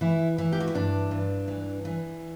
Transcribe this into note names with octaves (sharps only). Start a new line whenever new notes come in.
E3 E4
E3 E4
G4
F#4
E4
G2 D4
G2
E3
E3